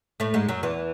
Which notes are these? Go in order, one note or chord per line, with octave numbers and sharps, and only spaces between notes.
A2 A3
G#2 G#3
F#2 F#3
E2 E3